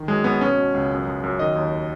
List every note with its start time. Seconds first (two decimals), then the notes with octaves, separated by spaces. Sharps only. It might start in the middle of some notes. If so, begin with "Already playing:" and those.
Already playing: D#3
0.08 F#2 G#3
0.24 F#2 B3
0.41 B2 C#4
0.57 B2
0.74 C#2
0.91 F#2
1.07 F#2
1.23 F#2
1.39 D#3 D#5
1.56 D#2